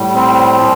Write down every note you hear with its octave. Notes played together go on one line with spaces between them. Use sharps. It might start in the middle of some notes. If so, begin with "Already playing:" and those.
Already playing: A2 G3
C4
A#2 F3